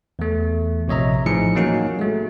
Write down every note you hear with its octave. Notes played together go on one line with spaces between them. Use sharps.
E2 A3
A#1 C3 C#5 D#5 E5 A#5
A2 E3 F3 D#4 G#4 C#7
F#3 A#3 C#4 D#4 F#4
G#3 A3